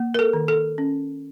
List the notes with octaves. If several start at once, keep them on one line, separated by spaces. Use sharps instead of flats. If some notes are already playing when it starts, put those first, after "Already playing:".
Already playing: A#3
A#4
A4
D#3
A4
C#4